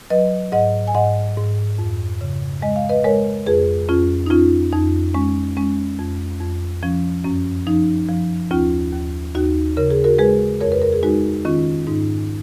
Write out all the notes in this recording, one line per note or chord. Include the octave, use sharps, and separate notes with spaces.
F#3 B4 D#5
G#2 D#5 F#5
G#5
G#2 D#5 F#5
G#2
F2
C#3
G#3 D#5
F5
B4 D#5
G#3 A#4 C#5
F2 G#4 B4
F2 C#4 F4
D#4
F2 C#4 F4
F2 D#4
G#3 C#4
G#3 C#4
F2
F2
F3 C#4
F#2 C#4
F3 D#4
F3
D#2 C#4 F4
D#2
D#2 D#4 F#4
C#3 A#4
G#4
F#4 A#4
G#3 G#4 B4
F2 A#4 C#5
B4
A#4
G#4
G#3 D#4 F#4
D#3 C#4 F4
G#2 D#4